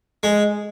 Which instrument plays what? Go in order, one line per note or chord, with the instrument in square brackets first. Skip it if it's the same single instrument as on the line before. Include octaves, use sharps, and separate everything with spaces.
[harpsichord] G#3